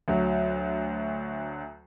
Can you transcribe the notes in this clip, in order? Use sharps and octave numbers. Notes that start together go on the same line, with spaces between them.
D2 F#3